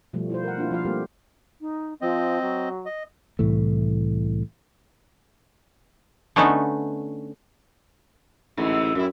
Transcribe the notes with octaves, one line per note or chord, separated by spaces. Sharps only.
B2 F3 G3 A3
E4 F4 C5
A#4 F#5
A#3 C4 D4 E4 F4
F3 F4 F5
G3 A3 A#3 C4 G4
D#4
F3 C4 D#5
F#3
D#5
C2 A2 E3 A3
D3 A3 B3 C#4 D#4
A1 G#2 D3 E3
F#2 A2 E4